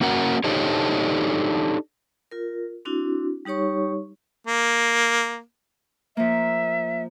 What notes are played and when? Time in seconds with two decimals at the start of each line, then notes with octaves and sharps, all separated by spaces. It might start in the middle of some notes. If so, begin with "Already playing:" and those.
0.01 A#3 C#4 F#4 A#4 F#5
0.44 D4 D#4 G4 A4 C5 C#5
2.31 F4 A#4
2.85 C4 D4 E4 F#4
3.45 G3 D#4 G4 C#5 C#6
4.47 A#3
6.17 F3 A#3 E5